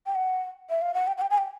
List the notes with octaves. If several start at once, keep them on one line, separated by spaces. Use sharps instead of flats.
G5
F#5
E5
F5
F#5
G5
F#5
G5
G#5
G5